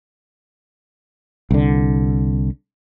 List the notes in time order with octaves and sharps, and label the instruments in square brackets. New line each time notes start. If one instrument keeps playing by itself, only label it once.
[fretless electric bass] C2 D3